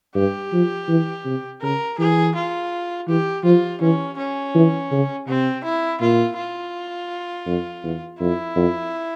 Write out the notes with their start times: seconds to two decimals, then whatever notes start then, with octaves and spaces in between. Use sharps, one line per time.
0.15 G2 G4
0.53 F3
0.88 E3
1.25 C3
1.62 C#3 A#4
1.98 E3 G#4
2.35 F4
3.08 E3 G4
3.44 F3 F4
3.81 E3 C#4
4.17 C#4
4.55 E3
4.91 C#3
5.28 C3 C4
5.64 E4
6.01 A#2 F4
6.37 F4
7.46 F2
7.83 E2
8.20 F2 E4
8.56 F2